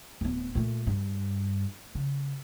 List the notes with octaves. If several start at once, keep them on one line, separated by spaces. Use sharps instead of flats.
D1 B3
A#2 A3
G2
C#3